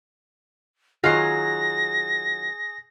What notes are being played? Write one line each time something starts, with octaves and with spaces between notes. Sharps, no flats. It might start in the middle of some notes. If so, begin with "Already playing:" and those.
D#3 F#3 F4 G#4 A#6 C7